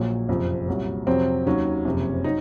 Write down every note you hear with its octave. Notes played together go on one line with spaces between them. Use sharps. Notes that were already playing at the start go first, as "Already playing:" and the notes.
Already playing: A#1 A#2 F#3
F#1 F2 C3 F3
C2 A#2 F#3
F2 C3 F#3 C4
D#2 D#3 F#3 C#4
F#1 F2 C3
F#3 D#4